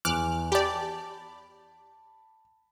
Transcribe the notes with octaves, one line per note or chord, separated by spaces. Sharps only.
E2 D6 F6 F#6
G4 D5 A5 B5